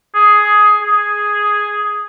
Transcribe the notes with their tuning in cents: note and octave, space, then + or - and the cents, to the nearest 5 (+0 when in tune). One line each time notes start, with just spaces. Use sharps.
G#4 +10
G#4 +0